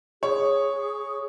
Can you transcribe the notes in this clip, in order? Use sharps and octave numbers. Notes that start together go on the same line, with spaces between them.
G#4 C#5